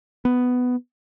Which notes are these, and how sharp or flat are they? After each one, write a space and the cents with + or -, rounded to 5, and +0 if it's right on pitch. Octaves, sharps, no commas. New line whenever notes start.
B3 +10